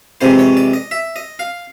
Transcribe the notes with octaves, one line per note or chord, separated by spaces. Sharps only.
F2 C3 E3 G#3 C5
C#5
D5
D#5
E5
D#5
F5